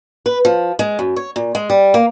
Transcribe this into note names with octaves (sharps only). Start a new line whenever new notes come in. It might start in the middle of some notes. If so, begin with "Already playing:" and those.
B4
F3
G#3
F#2
C#5
A#2
G#3
G3
A#3